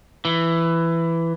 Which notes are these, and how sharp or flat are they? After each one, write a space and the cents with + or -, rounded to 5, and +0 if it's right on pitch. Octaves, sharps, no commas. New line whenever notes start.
E3 +10